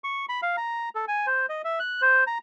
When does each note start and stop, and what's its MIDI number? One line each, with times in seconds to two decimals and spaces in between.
0.04 0.26 85
0.29 0.41 83
0.42 0.56 77
0.57 0.89 82
0.95 1.05 69
1.08 1.26 80
1.27 1.46 72
1.49 1.62 75
1.65 1.79 76
1.80 2.02 90
2.02 2.24 72
2.27 2.38 82